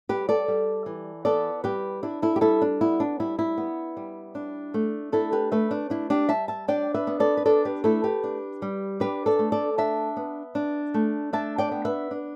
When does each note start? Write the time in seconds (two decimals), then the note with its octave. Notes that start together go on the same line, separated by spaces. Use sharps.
0.09 G3 G4 B4
0.29 A4 D5
0.48 G3
0.86 E3
1.25 B3 A4 D5
1.64 G3 G4 B4
2.03 D4 E4
2.22 E4 A4
2.36 G4
2.41 G3 E4 A4
2.62 D4
2.81 B3 E4
3.00 D4
3.20 G3 E4
3.39 E4
3.58 B3
3.97 G3
4.35 D4
4.74 A3
5.12 D4 E4 A4
5.32 G4 B4
5.52 A3 B4 E5
5.71 D4
5.90 D4 E4
6.10 D4 G4
6.29 G3 E5 A5
6.48 E5 A5
6.68 D4 D5 G5
6.94 B4 E5
7.07 B3
7.20 A4 D5
7.37 B4
7.46 D4 A4 D5
7.65 G4 B4
7.84 A3 E4 A4
8.04 G4 B4
8.24 D4
8.62 G3
9.00 D4 G4 B4
9.26 A4 D5
9.39 A3
9.52 A4 D5
9.78 D4 E5 A5
10.17 B3
10.55 D4
10.94 A3
11.33 D4 E5 A5
11.58 D5 G5
11.72 B3
11.85 B4 E5
12.11 D4